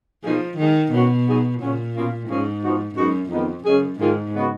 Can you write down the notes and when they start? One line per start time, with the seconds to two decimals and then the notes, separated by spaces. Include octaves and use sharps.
0.23 B2 F3 A#3 D#4 G#4
0.58 D#3 G#3 D#4 G#4
0.92 B2 D#3 F#3 C#4 F#4
1.26 F#3 B3 D#4 G#4
1.61 A#2 C#3 F#3 C#4
1.94 B2 A#3 C#4 F4
2.28 G#2 F3 A#3 C#4 G#4
2.63 F3 B3 D#4 F#4
2.96 F#2 G#3 B3 D#4 F#4
3.30 F2 D#3 G#3 B3 D#4
3.65 F#2 C#3 G#3 C#4 G#4
4.00 G#2 D#3 A#3 F4 G#4
4.33 C#3 G#3 B3 F#4